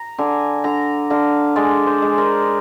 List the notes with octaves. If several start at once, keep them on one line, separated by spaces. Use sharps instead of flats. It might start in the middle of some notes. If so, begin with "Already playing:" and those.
Already playing: A#5
D3 G#5
D3 A#5
D3 F5
G#3 D5
C5
G#3
A#4